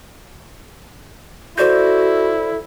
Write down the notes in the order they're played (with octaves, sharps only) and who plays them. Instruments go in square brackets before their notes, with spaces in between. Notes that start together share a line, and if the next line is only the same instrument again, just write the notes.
[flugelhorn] E4 [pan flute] F#4 [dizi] A4 [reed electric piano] C5 D5 G6